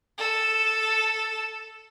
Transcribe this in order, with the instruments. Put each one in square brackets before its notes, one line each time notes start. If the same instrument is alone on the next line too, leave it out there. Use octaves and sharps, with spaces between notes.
[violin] A4 E7